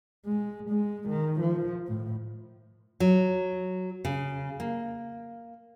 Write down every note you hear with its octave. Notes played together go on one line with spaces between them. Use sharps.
G#3
G#3
D#3
F3
A2
F#3
C#3
A#3